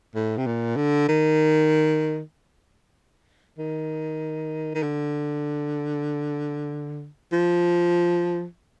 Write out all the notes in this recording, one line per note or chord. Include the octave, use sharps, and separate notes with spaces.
A2
C3
A#2
D3
D#3
D#3
D#3
D3
F3